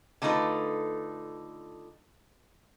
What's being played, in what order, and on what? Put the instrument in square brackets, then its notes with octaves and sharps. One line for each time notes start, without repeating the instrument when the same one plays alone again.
[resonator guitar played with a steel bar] D3 A3 D#4 F4 A4 B4